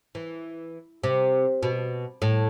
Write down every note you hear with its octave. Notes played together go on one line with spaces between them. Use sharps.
E3
C3
B2
A2